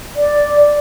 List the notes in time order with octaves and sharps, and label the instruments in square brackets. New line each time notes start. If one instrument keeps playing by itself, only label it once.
[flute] D5